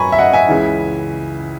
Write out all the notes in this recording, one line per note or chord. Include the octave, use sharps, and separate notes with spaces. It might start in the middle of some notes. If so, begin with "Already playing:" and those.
Already playing: F#2 G#5 A#5 B5 C#6
E5
D#5 F#5
E5 G#5
C#2 C#3 E3